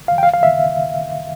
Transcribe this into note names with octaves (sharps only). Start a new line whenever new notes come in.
F5
G5
F5
F5
E5